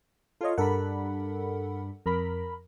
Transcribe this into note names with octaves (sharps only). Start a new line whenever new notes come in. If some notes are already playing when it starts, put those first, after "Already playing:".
F4 A4 C#5 D#5
G2 D4 A4 A#4 F#5 B5
F2 A#4 B5